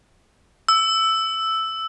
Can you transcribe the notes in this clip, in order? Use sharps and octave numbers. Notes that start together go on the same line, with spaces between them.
E6